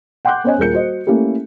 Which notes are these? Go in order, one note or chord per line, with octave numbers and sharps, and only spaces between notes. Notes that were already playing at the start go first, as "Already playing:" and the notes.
F#5 G5 C6 D6 F#6 G6
B3 C#4 C5 C#5 D#5 G#5
D#1 F4 G#4 A#4 G6 C#7
F#4 C5 D#5
A3 A#3 C#4 E4 G4